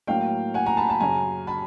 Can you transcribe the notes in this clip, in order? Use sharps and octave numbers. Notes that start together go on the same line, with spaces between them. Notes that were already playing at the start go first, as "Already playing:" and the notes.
A2 F#3 A#3 F5 G5
F#5 G#5
G#5 A#5
A5 B5
A5 B5
F#2 C#3 F#3 G#5 A#5
A5 B5